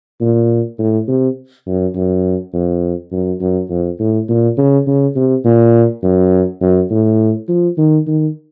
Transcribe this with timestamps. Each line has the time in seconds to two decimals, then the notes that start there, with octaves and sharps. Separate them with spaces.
0.21 A#2
0.79 A2
1.08 C3
1.66 F#2
1.95 F#2
2.54 F2
3.12 F#2
3.41 F#2
3.70 F2
4.00 A2
4.29 A#2
4.58 C#3
4.87 C#3
5.16 C3
5.45 A#2
6.03 F#2
6.61 F#2
6.90 A2
7.48 F3
7.78 D#3
8.07 D#3